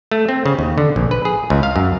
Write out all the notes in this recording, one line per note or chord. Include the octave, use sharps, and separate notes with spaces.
A3
C4
C#3
D#2
D3
A#1
B4
G#4
C#2
F5
F#2